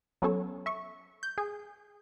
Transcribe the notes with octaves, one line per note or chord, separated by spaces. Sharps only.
F#3 B3 C#4 A4 C#5
E5 C#6
G6
G#4